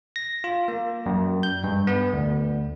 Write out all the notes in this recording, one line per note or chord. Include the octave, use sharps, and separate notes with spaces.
A#6
F4
A#3
F#2
G6
G2
B3
D2